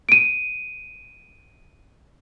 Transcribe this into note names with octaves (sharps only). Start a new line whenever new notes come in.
D7 D#7